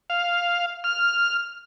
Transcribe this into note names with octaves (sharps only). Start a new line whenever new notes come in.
F5
F6